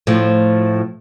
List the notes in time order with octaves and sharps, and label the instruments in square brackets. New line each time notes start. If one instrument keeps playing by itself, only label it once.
[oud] A2 F3